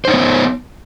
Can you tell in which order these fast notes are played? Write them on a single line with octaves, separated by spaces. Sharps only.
C5 D#4 C#5 B3